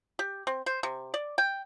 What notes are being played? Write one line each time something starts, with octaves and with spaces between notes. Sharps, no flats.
G4
C4
C5
C3
D5
G5